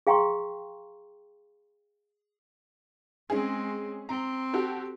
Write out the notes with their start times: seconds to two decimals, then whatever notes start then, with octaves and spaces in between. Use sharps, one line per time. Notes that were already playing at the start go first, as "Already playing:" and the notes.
0.07 G#4 F5 G5 A#5 C6 C#6
3.30 G#3 C4 C#4 G#4
4.09 C4 A#5
4.53 F#4 G4 A4